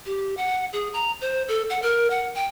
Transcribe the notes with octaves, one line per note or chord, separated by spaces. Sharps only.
G4
F#5
G#4
A#5
C5
A4
F#5
A#4
F#5
G5